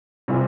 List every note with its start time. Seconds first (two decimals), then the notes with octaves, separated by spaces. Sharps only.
0.28 C3 G3 C4 F4 G#4